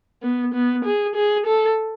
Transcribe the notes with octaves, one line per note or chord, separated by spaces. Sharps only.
B3
B3
G#4
G#4
A4